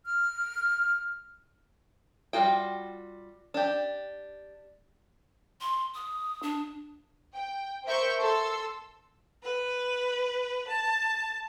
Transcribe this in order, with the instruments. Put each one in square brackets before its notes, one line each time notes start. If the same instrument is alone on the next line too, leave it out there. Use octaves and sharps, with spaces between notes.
[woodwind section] F6
[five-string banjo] G3 F4 F#4 G5
D4 G4
[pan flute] C6
D#6
D4
[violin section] G5
A#4 C5 E5 C#6 G6
A4 C6 E6
[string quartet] B4
A5